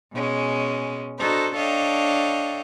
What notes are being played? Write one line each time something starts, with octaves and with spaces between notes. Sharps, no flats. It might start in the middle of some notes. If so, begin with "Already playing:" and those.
B2 G#3 C#4
D4 D#4 F#4 A4 C5
D4 A4 C#5 D#5 F5 G5